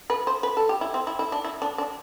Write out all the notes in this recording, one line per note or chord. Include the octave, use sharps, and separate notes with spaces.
B4
C5
B4
A4
G4
E4
C4
E4
E4
D4
E4
D4
D4